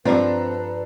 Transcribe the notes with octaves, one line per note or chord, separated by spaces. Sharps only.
G2 F3 C4 D4 A4 B4 A#5